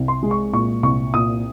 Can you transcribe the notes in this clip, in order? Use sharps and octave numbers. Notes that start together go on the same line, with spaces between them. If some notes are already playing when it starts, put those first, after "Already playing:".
Already playing: C2
C6
G#3
C#6
A#2 C#6
C2 C#6
A#2 D#6